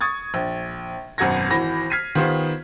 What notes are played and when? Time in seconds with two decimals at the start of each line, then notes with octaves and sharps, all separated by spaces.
0.01 C#6 D#6 G#6 A6
0.34 A#1
1.18 G#1 F#2 B2 F#5 G#6 A#6
1.50 G#1 E3 F#4 B5 A#6
1.90 F6 G#6 B6 C7 D#7
2.15 D#3 B3 F4 G4 C5